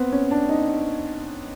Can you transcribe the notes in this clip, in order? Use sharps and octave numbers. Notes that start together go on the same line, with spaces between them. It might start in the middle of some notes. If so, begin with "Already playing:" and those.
Already playing: B3 C4
C#4
D4
D#4